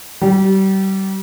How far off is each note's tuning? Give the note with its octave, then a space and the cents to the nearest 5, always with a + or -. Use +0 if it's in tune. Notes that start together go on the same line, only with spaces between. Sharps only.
G3 -30